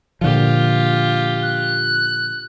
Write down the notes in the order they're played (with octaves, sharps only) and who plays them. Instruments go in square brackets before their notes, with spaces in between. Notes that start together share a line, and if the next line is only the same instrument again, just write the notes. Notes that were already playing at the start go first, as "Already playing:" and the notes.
[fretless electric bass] A#2 D3 F3 [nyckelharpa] F4 G4
[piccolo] F#6